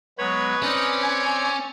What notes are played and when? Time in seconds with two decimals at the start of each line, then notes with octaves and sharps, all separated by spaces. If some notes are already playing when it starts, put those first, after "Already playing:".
0.19 F#3 G#3 B3 B4 C#5
0.63 C4 C#4 D#4 D5
1.03 G#5